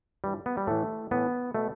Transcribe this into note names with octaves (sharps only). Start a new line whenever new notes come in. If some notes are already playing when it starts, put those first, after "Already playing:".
G2 E3 G3
B3
G3
A2 E3 A3
A2 E3 B3
B2 A3